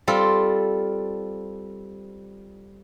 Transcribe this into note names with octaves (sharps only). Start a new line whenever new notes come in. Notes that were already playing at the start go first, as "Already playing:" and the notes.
G3 C4 F4 A4